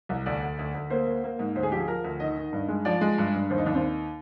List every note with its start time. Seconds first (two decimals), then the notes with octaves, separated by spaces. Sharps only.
0.09 C2
0.26 D2 D5
0.42 D2
0.59 D2
0.74 D2
0.90 A#3 C5
1.06 A#3
1.24 A#3
1.39 G#2
1.55 D2 C5
1.63 G#4
1.71 F3 G4
1.80 G#4
1.88 F3 A#4
2.04 D2
2.20 D#3 D#5
2.37 D#3
2.53 G2
2.68 G#3
2.85 F3 D5
3.01 G#3
3.18 G2
3.34 G2
3.50 D#2 C5
3.58 D#4
3.66 D#2 D4
3.75 C4